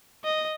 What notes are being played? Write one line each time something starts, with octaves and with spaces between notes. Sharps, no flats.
D#5